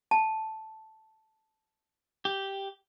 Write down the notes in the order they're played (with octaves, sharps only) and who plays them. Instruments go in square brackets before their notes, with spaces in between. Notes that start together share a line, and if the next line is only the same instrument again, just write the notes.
[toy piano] A5
[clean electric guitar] G4